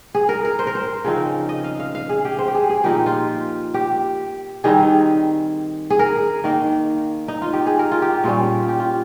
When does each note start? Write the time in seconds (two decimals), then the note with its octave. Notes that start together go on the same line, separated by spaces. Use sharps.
0.15 G#4
0.29 A#4
0.45 A#4
0.59 C5
0.67 A#4
0.75 C5
1.04 C#3 F3 C4 D#4
1.49 D#5
1.64 F5
1.79 F5
1.95 F5
2.09 G#4
2.25 G4
2.39 C5
2.48 G4
2.55 G#4
2.69 G#4
2.84 A#2 F3 A#3 D#4 G4
3.06 F4
3.74 G4
4.64 D#3 G3 C4 D#4 G#4
5.90 G#4
5.99 A#4
6.44 D#3 A#3 D#4
7.28 D#4
7.42 F4
7.53 G4
7.66 G#4
7.79 A#4
7.91 F4
8.02 G4
8.24 A#2 G3 C#4 F4
8.68 G4
8.80 F4